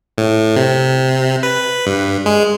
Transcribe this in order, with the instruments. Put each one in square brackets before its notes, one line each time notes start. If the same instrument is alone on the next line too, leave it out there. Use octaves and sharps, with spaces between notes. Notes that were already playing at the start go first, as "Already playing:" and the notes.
[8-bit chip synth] A2
C3
B4
G2
G#3